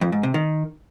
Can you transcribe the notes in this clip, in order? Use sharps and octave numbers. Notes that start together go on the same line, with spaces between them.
F2
G#2
C3
D#3